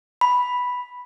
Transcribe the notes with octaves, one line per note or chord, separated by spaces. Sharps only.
B5